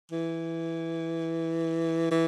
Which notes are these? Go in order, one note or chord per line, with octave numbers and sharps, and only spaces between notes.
E3
E3